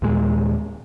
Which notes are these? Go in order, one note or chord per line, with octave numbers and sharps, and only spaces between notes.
D#2 A#2 G#3